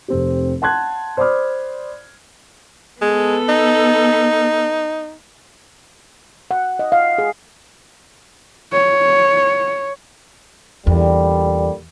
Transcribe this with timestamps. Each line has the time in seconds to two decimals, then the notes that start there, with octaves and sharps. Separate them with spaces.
0.08 F1 C4 G4
0.62 F#5 A5 C6 F#6 G#6
1.17 C5 D5 B5 D6 D#6 F6
3.01 G#3 B3 A4
3.49 D#4
6.51 F#5
6.79 D#5
6.92 F5
7.18 G#4
8.73 C#5
10.87 E2 A#2 D3 G3